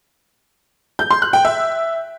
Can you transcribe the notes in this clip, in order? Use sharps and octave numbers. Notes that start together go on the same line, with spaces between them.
G6
C6
F#6
G5
E5